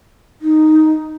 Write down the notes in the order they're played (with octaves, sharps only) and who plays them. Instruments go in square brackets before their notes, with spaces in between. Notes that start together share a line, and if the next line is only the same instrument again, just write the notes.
[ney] D#4